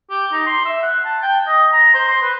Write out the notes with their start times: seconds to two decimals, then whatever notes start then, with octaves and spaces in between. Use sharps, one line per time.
0.10 G4
0.33 D#4
0.47 C6
0.66 E5
0.83 F#5
1.05 A5
1.22 G5
1.47 D#5
1.73 A#5
1.94 C5
2.08 C6
2.22 B4